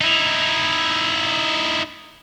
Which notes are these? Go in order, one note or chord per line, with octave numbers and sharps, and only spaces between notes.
D#4 E4